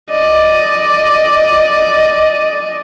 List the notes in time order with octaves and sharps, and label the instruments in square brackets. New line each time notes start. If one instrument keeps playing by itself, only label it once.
[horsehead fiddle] D5 D#5